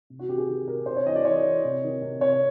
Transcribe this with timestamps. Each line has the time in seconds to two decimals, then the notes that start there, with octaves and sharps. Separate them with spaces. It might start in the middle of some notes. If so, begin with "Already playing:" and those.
0.10 C3
0.19 F#4
0.28 C3 G4
0.38 G#4
0.48 D#3
0.67 C3 A#4
0.86 C3 C5
0.97 C#5
1.06 E3 D#5
1.16 D5
1.25 E3 C#5
1.44 E3
1.64 C3
1.83 D#3
2.02 C3
2.21 C3 C#5